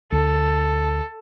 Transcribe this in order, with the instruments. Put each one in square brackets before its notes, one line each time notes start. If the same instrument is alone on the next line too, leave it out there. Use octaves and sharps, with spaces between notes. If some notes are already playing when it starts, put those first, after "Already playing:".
[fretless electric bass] D2 [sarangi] A4